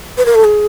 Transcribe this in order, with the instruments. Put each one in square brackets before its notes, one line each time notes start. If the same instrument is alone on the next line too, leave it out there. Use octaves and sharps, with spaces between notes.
[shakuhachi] B4
A#4
A4
G#4